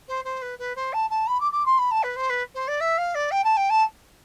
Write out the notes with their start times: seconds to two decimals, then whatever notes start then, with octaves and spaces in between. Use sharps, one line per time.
0.08 C5
0.25 C5
0.42 B4
0.59 B4
0.76 C5
0.93 A5
1.10 A5
1.27 B5
1.40 D6
1.52 D6
1.66 C6
1.78 B5
1.91 A5
2.03 B4
2.16 C5
2.30 B4
2.55 C5
2.68 D5
2.80 E5
2.98 F5
3.15 D5
3.31 G5
3.44 A5
3.57 G5
3.70 A5